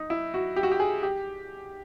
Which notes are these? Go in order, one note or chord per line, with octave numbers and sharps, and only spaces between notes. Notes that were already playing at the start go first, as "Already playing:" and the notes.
Already playing: D#4
E4
F#4
G4
F#4
G4
G#4
G4